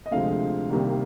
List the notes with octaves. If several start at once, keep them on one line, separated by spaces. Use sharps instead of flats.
D#5
D2 C3 F3 G#3 F5
C2 C3 D#3 G3 A#3